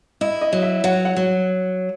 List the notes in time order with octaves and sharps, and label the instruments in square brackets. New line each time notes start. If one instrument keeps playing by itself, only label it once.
[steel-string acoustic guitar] E4 [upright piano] D#5
[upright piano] D#5
[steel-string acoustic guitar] F#3
[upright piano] E5
[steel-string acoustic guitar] F#3 [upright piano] F#5
[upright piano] F#5
[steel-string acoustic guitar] F#3